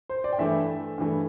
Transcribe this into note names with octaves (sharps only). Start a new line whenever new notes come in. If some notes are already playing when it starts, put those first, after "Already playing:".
C5
D5
G5
G2 E3 A3 E5
G2 E3 A3